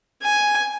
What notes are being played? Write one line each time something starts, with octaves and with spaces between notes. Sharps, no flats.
G#5